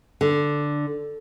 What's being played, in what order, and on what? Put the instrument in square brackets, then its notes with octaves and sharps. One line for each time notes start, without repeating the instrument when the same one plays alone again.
[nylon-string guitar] D3